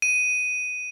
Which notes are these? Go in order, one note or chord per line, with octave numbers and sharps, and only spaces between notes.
D#7